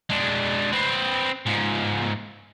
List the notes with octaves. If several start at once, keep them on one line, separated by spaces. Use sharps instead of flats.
G#3 D4
C4 B4
G#2 F3